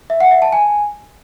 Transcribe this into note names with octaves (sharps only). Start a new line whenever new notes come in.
E5
F#5
E5
A5
G#5